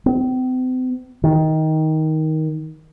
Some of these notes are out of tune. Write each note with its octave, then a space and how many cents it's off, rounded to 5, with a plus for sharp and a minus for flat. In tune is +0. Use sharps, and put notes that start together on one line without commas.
C4 -40
D#3 +15